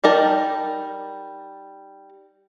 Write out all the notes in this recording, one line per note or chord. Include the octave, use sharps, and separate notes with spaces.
G3 D#4 A#4 A5